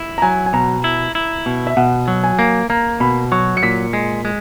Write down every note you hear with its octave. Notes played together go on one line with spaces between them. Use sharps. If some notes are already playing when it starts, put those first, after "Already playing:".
Already playing: E4
A#5
F#3 G#5
G#5
B2 A#5
E4
E4
B2
E5
B2 F#5
F#3
G#5
A#3
A#3 A#5
B2 B5
F#3 C#6
C#7
A#2 B6
G#3
G#3